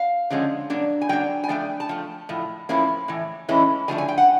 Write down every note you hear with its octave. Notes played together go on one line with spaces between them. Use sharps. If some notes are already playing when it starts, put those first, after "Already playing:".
Already playing: F5
D3 F3 G#3 C#4
F#3 A#3 D4
G#5
F#3 A#3 D4 G5
G#5
F3 A3 D4 G5
A5
F3 A3
A2 F3
A2 F3 A#3 C#4 E4
A2 E3
A2 E3 G#3 C#4 E4
D3 F3 A3 D4 G#5
G#5
G5
F#5